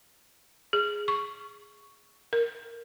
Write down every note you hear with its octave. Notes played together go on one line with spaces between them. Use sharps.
G#4
C#6
A#4